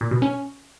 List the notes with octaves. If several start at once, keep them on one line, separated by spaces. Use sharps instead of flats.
A#2
B2
C#4